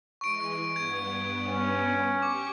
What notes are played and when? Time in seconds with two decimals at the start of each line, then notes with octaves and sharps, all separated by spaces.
0.21 E3 G#3 C#6 D7
0.76 G2 B3 G#6
1.47 C#4
2.22 G4 C#6 D6